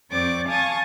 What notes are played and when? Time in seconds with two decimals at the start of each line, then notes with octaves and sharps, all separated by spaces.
0.11 F2 C4 D5 C#6 D6
0.49 F5 G#5 A5 C#6 D#6 A6